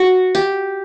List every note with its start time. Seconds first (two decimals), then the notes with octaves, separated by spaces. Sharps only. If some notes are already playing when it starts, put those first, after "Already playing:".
Already playing: F#4
0.35 G4